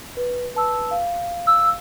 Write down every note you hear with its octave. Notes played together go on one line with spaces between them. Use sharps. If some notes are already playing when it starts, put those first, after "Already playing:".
B4
B4 A5 E6
F5
E6